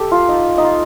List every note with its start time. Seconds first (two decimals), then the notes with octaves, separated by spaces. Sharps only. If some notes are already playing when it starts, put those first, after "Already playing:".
Already playing: G4 A4
0.12 F4
0.29 D#4
0.58 D#4
0.64 F4